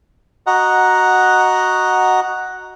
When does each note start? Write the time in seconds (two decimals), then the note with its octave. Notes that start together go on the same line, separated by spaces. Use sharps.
0.47 F#4 D#5 F#5 A#5